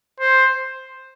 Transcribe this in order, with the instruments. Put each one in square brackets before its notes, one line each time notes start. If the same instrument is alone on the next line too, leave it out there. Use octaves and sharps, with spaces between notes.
[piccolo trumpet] C5